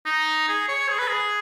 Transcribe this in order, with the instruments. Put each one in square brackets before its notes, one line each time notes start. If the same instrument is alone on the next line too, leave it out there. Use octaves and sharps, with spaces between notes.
[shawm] D#4
G#4
C#5
G#4
B4
G#4